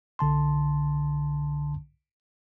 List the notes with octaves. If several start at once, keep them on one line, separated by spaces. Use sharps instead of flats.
B1 D3 A5 C6